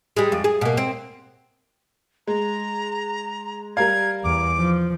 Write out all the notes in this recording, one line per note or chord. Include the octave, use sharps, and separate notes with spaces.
G3 G#3
F2
G#4
B2 A#3
C4
G#3 A#5
G3 A#4 F5 G#6
E2 D6
F3